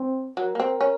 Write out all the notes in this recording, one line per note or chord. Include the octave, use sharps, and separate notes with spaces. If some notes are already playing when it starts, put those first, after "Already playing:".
Already playing: C4
F#3 A#4
A#3
C4
C#4